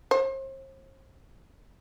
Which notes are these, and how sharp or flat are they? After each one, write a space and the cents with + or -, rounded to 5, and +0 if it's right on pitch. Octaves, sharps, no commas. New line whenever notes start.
C5 +40